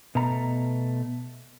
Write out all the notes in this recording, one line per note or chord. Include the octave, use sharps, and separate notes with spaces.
B2 A3 A#5